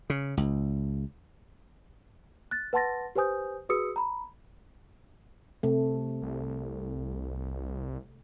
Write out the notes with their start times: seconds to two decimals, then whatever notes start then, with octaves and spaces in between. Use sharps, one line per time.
0.10 C#3
0.37 C#2
2.51 F#6 A6
2.73 B4 F#5 A5 C6 A6 A#6
3.16 G4 B4 C5 G#5 D#6 G6
3.69 F#4 G#4 B4 D#6 E6 C#7
3.96 A#5 B5
5.63 C3 A3
6.22 C2